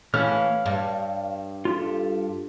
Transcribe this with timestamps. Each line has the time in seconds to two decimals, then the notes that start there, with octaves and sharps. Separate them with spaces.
0.14 E3 A3 C#4 C#5 F5 F6
0.66 G2
1.65 F4 G4 A4